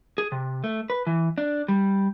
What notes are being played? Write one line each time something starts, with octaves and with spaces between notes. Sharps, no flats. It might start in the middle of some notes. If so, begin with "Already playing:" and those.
G#4
C3
A3
B4
E3
D4
G3